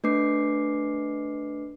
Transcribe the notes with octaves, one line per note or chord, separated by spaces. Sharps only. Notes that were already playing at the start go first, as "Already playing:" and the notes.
A3 D4 B4 D6 C7